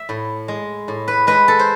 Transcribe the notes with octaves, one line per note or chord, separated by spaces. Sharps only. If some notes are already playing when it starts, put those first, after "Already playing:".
Already playing: E5
A2
G#3
A2
B4
G#3 B4
A4
C5